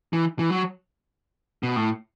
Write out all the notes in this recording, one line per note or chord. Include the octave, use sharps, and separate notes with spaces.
E3
E3
F#3
B2
A2